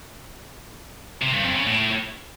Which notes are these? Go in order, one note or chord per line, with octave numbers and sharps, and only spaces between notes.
C3
G2
F2
C#3
A2